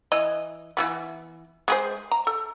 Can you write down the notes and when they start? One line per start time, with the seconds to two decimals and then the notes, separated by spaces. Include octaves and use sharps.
0.12 E3 D#5
0.77 E3 G3 B3
1.68 G#3 G#4 C5
2.11 A#5
2.27 A4